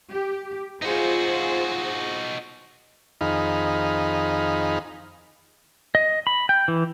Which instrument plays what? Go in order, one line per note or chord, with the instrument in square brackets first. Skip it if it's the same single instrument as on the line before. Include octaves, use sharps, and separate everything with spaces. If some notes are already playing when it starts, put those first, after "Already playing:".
[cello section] G4
[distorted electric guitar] D#4 F#4 [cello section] F4 G#4 C5
[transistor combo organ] F2 D#3 D#4 G#4 F5 B5
[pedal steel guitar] D#5
B5
G5
E3